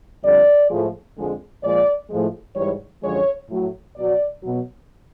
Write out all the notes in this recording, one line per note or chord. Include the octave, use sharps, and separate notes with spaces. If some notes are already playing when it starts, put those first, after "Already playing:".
F2 D3 G3 D5
A2 F3 G#3
F2 D3 F3 G#3
A#2 F3 G#3 D5
A2 F3 G#3
G#2 E3 G3 C#5
F#2 D3 F3 G#3 C#5
A2 F#3
B2 F#3 D5
B2 F#3